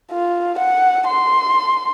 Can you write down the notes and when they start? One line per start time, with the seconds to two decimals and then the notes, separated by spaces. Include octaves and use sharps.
0.11 F4
0.58 F#5
1.08 C6